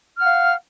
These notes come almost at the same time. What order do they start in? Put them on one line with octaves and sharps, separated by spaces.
F6 F#5 F5